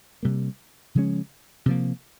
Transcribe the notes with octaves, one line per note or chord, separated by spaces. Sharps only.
C3 G3 A#3
C#3 F3 G#3 C#4
C3 F3 A#3